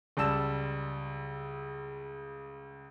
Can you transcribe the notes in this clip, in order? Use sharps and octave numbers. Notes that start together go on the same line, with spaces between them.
C#2 G3 A5 E6 E7